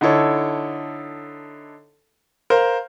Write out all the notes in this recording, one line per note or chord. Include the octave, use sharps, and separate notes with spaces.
D3 D#4 E4 A4 C#5
A#4 C5 F5